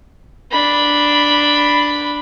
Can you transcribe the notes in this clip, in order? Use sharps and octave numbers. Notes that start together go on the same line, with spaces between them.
D4 B5